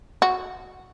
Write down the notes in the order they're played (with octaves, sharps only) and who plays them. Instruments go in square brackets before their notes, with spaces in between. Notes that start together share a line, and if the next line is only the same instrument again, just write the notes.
[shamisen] F#4